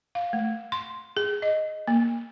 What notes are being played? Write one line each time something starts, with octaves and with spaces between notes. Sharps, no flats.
F5
A3
C6
G#4
D#5
A#3